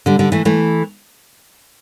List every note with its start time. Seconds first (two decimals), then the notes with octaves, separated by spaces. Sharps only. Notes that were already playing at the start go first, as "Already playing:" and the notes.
0.06 D3 G3
0.19 D3 G3
0.32 E3 A3
0.45 E3 A3